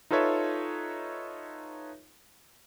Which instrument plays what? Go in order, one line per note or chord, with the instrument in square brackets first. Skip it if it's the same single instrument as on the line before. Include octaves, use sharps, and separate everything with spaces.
[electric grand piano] D#4 F4 A4 B4 C#5 E5